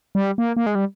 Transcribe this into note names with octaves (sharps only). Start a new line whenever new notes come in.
G3
A#3
A#3
G#3
G3